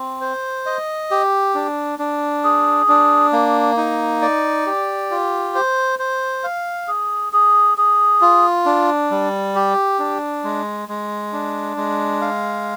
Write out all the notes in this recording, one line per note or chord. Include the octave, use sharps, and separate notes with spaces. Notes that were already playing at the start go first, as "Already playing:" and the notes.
Already playing: C4
C5
D#5
G4
D4
D4
G#4
D4
A#3
D#4
D5
G4
F4
C5
C5
F5
G#4
G#4
G#4
F4
D4
G3
G4
D4
G#3
G#3
D4
G#3
F5